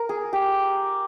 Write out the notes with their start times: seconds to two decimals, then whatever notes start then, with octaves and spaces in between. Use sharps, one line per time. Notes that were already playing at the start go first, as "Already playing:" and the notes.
Already playing: A#4
0.09 G#4
0.33 G4